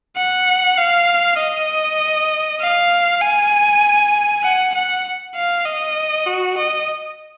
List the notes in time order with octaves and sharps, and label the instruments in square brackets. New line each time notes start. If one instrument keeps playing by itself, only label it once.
[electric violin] F#5
F5
D#5
F5
G#5
F#5
F#5
F5
D#5
F#4
D#5